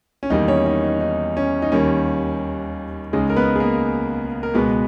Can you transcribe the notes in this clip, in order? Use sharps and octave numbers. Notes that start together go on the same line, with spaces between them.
C#4
E2 D#3 G3 A#3 D#4
C#4 C#5
D#4
D#4
D#4
C#4
D#4
D#2 D#3 G3 A#3 C#4
C#2 C#3 G#3 D#4
A#4
B3 B4
G#4
A#3 A#4
A#4
C#2 B2 G#3 B3 B4